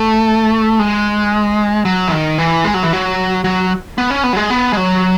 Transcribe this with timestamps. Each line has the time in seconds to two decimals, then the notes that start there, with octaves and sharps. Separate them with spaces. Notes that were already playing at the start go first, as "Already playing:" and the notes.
Already playing: A3
0.79 G#3
1.85 F#3
2.08 E3
2.12 D#3
2.38 E3
2.64 G#3
2.74 F#3
2.83 E3
2.93 F#3
3.44 F#3
3.98 B3
4.11 C#4
4.24 B3
4.33 F#3
4.37 G#3
4.50 B3
4.73 G#3
4.77 F#3